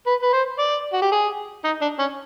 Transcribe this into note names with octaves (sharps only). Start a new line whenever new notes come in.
B4
B4
C5
D5
F#4
G4
G#4
D#4
D4
C#4